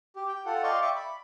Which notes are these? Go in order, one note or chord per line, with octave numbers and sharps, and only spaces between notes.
G4
G5
F4 A4 F#5
D5 D#5 F5 G5 C6 C#6
E5 C#6 D6
B5